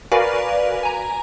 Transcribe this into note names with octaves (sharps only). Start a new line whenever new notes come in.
F#4 A#4 B4 D5 F5 G#5
G#5 A#5